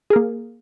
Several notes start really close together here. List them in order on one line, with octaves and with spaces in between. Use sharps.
G#4 A#4 A#3